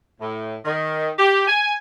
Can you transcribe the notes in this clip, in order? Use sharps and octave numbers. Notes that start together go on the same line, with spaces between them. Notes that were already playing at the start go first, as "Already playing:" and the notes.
A2
D#3
G4
G#5